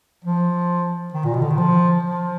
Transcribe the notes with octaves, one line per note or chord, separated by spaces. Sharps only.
F3
D#3
A#2
B2
D3
D#3
F3
F3